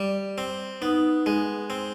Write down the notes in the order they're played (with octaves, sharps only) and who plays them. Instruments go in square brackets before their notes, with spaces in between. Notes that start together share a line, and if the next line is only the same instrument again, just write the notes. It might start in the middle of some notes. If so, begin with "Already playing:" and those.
Already playing: [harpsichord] G3
C4
[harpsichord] B3 [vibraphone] D#4
[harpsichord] G#3
C4